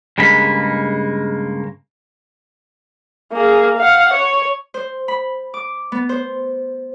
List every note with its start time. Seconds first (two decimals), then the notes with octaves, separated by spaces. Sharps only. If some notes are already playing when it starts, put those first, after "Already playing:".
0.18 G2 C#3 G#3 A#3 B5
3.33 A#3 G#4
3.77 F5 F#5
4.13 C#5
4.74 C5
5.08 B5
5.54 D6
5.92 B3
6.09 C5